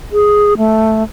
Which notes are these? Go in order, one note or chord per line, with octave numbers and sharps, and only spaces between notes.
G#4
A3